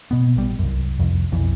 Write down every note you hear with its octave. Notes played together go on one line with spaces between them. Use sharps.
B2 B3
A#1 G3
C2 F#2
C2 F2
B1 F2 E3